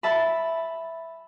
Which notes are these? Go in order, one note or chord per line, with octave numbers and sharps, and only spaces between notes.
E5 A5 B5